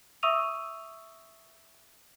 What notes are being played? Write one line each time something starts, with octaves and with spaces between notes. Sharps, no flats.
E5 C#6 D#6 E6 D#7 F7